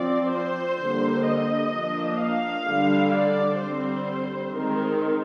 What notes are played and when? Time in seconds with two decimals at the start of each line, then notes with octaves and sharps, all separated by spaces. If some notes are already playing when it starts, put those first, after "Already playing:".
Already playing: F3 C4 D5
0.32 C5
0.79 D3 G3 A#3
1.27 D#5
1.73 F3 A#3 D4
2.20 F5
2.68 D3 G3 D4
3.15 D5
3.62 D3 G3 C4 C5
4.56 D#3 G#3 C4 A#4